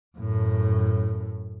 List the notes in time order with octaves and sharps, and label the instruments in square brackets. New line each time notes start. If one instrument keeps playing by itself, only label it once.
[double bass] F#2 A2